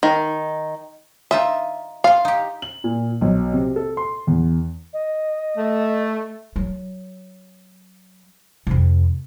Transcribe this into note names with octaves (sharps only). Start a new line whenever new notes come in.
D#3
D#4 F4 D#5 E5
F4 F5 C6
D#4 G4
F#7
A#2
B1
C3
A4
C6
E2
D#5
A3
F#3
F2 C3